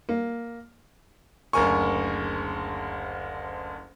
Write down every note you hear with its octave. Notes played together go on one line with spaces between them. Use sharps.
A#3
F#1 D2 A#4 G#5 C#6